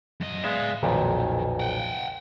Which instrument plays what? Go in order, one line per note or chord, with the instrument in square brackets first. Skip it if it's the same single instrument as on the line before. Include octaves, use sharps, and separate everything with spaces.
[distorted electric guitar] F#2 D#5
[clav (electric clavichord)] G#3 B3 E5 [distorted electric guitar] D5 F5
[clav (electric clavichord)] B1 F2 A#2 [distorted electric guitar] D#3
[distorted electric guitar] F#5 G5